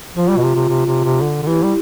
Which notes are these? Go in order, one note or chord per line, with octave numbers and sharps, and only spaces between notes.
F3 F4
G3
B2
C3
C3
C3
C3
C3
D3
D3
E3 E4 G4
G3